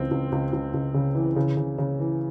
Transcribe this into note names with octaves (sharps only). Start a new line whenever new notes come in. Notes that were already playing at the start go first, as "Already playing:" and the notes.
Already playing: C#2 E3 C4
C#2
C#2
C#2
C#2
C#3
E3
C#3
C#3
C#3
E3